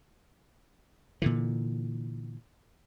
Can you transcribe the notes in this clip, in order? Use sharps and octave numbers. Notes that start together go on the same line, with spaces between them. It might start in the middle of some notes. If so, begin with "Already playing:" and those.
A#2 D3 E3